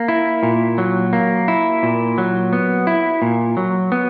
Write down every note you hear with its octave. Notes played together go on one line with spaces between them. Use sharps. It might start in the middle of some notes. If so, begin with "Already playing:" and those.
Already playing: A#3
E4
A#2
F#3
A#3
E4
A#2
F#3
B3
E4
A#2
F#3
B3